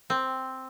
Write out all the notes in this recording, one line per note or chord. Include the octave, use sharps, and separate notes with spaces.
C4